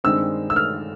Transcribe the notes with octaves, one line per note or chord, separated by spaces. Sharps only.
G2 D#3 G#3 C4 E6
E6
F6